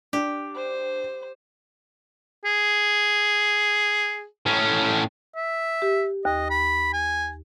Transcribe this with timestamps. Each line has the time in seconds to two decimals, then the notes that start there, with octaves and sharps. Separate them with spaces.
0.13 D4 G4
0.56 C5
2.45 G#4
4.46 A2 C#4
5.36 E5
5.82 G4
6.25 D#2 D#5
6.50 B5
6.93 G#5